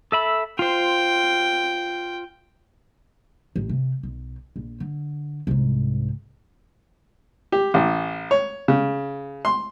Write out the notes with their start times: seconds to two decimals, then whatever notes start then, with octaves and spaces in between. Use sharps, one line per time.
0.12 A4 E5 B5
0.59 F4 C5 G5
3.56 A1
3.69 C3
4.03 B1
4.56 A#1
4.80 D3
5.47 C2 G#2
7.52 G4
7.74 A1
8.31 C#5
8.68 C#3
9.45 C6